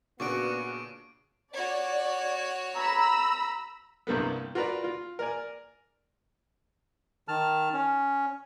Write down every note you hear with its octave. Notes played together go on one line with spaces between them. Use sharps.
A#2 C#3 B3 D4 F#4 C#6 D6 D7
F#4 C#5 D5
A#5 B5 E6
C2 G2 G3 A#3 B3
F4 F#4 A#4 B4 D5
F4
A#4 D5 G#5
D#3 A5 F6
C#4